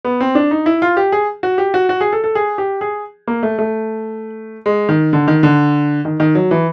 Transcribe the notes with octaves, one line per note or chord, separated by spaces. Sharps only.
B3
C4
D4
D#4
E4
F4
G4
G#4
F#4
G4
F#4
F#4
G#4
A4
A4
G#4
G4
G#4
A#3
A3
A3
G#3
D#3
D3
D#3
D3
D#3
D#3
F#3
E3